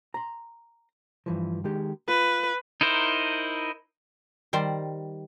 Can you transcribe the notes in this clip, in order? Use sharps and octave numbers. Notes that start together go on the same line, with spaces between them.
A#5 C6
G2 E3 F3
D#3 G#3 G4
F4 B4
D#4 E4 A#4 C5
D#3 G3 C5 D5